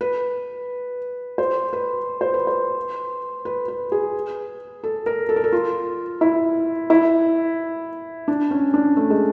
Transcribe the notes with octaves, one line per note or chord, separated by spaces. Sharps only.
B4
C5
B4
C5
B4
C5
B4
B4
G#4
A4
A#4
A4
A#4
A4
F4
E4
E4
D4
C#4
D4
A3
G#3